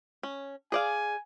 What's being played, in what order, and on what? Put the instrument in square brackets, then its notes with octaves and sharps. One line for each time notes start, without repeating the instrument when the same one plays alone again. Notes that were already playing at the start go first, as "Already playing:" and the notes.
[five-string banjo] C#4
[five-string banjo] G#4 D5 F5 [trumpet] G#5